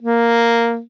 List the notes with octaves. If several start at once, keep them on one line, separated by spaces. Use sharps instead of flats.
A#3